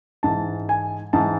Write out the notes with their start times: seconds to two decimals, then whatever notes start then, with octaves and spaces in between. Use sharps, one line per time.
0.23 G#2 E3 A5
0.69 G#5
1.13 G#2 E3 A5